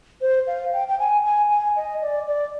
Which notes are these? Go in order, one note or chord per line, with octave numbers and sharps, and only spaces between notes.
C5
F5
G5
G5
G#5
G#5
G#5
D#5
D5
D5